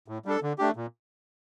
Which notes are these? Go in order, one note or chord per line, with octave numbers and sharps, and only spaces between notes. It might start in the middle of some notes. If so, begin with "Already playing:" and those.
A2
G3 D4 A4
D3
A3 D4 G4
A#2